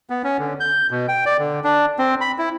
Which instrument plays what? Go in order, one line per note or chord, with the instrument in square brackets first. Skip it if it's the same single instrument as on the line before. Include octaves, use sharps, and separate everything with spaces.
[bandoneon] B3
C#4
D3
G6
B2
G5
D5
D3
D4
C4
B5
E4